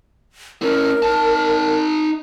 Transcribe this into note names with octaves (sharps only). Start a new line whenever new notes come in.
C#4 E4 A#4
D#4 A5